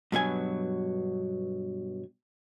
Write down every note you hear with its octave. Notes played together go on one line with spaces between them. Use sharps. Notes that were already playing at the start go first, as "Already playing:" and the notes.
G2 B2 F#3 G#5